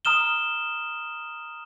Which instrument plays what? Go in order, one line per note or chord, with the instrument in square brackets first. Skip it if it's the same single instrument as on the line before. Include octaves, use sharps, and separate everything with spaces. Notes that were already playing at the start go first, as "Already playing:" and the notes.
[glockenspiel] A#5 D#6 F6 E7 G7